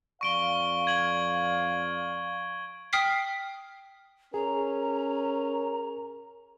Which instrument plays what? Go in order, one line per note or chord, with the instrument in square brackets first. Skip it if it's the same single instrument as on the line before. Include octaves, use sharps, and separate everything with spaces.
[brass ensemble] F2 D5 F5 [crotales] C#6 D7 G7
[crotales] G#6 F#7
[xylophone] G5 D#6 F6 B6 C7
[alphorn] C#4 [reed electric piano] G#4 [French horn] A#4 [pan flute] A#5